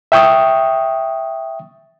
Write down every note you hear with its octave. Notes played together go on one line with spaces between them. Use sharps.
E5 G5 C#6 D#6